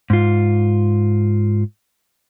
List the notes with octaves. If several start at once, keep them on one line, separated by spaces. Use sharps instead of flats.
G#2 F4